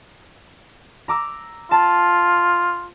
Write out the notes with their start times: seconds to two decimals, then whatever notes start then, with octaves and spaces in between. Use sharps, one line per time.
1.08 A#5 D6 E6
1.71 F4 A5